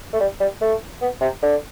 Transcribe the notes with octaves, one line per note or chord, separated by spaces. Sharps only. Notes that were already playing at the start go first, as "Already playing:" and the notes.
A3
G3
G3
A3
B3
C3
D3